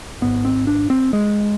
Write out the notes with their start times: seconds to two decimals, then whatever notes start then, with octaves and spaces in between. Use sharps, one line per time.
0.21 G#1 G#2 B3
0.45 C4
0.67 D4
0.90 C4
1.13 G#3